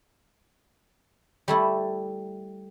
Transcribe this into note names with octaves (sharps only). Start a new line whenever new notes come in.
G3 A3 E4